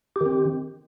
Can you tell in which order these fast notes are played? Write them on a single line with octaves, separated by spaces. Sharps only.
G4 D#3 C4